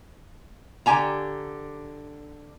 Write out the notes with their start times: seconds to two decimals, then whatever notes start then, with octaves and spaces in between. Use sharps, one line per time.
0.86 D3 G4 G#5 A#5